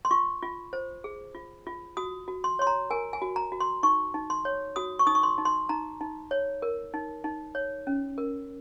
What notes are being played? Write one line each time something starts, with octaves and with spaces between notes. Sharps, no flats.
C6
F4 C#6
F4
C5
G#4
F4
F4
F#4 D#6
F#4
C6
C#5 C6
A#5
A#4 G#5
G#5
F#4
A#5
F#4
C6
D#4 C#6
D#4
C6
C#5
F#4 D#6
C#6
D#4 D#6
C#6
C6
D#4
C6
D#4 A#5
D#4
C#5
A#4
D#4
D#4
C#5
C#4
A#4